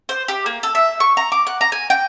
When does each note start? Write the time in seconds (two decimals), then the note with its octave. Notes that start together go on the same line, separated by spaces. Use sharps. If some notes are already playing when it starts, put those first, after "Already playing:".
0.09 C5
0.28 G4
0.46 A#3
0.63 A4
0.75 E5
1.00 C#6
1.17 A#5
1.32 D6
1.47 F#5
1.61 A#5
1.72 G#5
1.90 G5